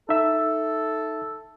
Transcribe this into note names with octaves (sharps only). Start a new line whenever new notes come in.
D#4 A4 E5